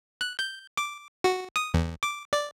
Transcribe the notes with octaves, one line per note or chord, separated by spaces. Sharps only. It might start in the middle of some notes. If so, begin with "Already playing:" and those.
F#6
G6
D6
F#4
D#6
E2
D6
D5